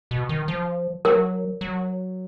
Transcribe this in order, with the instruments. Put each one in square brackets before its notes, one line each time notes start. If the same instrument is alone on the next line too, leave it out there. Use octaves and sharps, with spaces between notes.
[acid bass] B2
D#3
F3
[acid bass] F#3 [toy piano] A#4
[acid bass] F#3